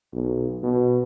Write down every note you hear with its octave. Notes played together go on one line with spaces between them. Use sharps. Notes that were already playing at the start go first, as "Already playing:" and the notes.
B1
B2